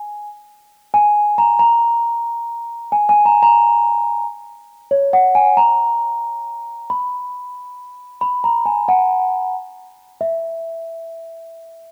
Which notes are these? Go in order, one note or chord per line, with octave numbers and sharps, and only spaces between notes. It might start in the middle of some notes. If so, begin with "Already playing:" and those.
Already playing: G#5
G#5
A#5
A#5
G#5
G#5
A#5
A#5
C#5
F#5
G#5
A#5
B5
B5
A#5
G#5
F#5
E5